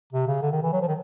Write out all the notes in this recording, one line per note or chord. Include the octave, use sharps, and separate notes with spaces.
C3
C#3
D3
D#3
E3
F#3
F3
D#3